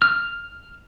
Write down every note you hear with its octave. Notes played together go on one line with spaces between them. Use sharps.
F6